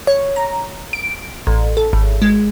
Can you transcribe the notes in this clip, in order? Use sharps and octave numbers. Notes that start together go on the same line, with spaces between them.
C#5
A#5
D7
A1
A4
G#1
G#3